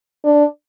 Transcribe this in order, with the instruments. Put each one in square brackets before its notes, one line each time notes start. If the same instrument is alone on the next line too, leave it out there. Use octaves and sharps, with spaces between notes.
[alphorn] D4